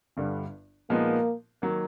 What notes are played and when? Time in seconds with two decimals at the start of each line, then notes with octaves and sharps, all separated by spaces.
0.17 G1 G2 D3 G3
0.90 A#2 F3 G#3 A#3 B3 D#4
1.62 D#3 F#3 A#3